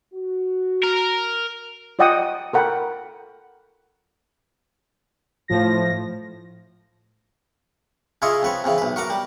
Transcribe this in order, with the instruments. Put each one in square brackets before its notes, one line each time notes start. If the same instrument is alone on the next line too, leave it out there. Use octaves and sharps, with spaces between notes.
[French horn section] F#4
[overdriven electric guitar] A#4
[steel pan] F4 D5 D#5 F#5 G5 D#6
A4 A#4 F#5 G5 B5
[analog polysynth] A2 F3 A#6
[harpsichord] C#3 E4 F4 C#5 D#5
F2 B4 C#5
F2 C#3 E3
B1 B4
F#4 A#4 F#5 D6
G3